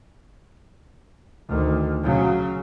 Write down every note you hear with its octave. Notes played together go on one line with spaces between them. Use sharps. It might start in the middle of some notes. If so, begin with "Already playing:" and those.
D2 D#3
C#3 F#3